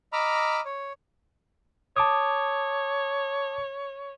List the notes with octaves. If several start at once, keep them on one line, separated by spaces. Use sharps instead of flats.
D#5 A#5 B5 D6 E6 F6
C#5
C#5 A5 D6 D#6